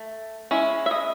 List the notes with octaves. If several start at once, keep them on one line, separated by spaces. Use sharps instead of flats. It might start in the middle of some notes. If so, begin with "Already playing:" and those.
Already playing: A3
G#3 C#4 E4
E5
D#5